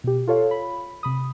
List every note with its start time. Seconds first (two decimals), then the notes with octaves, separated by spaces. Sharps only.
0.04 B2 G4
0.27 F4 A4 C#5 F5
0.51 B5
1.03 C3 B5 D#6